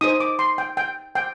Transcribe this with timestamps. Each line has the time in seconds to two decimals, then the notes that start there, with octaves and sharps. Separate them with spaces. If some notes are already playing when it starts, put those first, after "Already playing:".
0.01 D#4 G#4 C5 D#6
0.20 D6
0.39 C6
0.58 G5
0.77 G5
1.15 G5